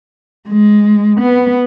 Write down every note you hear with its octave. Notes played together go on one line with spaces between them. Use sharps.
G#3
B3